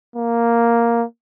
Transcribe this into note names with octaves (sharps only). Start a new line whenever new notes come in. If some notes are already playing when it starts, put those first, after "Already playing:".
A#3